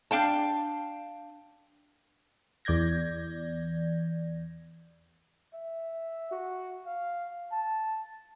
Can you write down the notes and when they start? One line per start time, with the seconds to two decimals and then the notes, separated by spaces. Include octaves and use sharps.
0.11 D4 F5 G5 A5
2.65 E2 D5 G6 G#6 A#6
5.54 E5
6.31 F#4
6.86 F5
7.52 A5